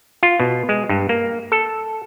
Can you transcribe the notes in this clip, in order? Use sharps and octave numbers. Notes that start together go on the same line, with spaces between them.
F4
B2
G#3
G2
A#3
A4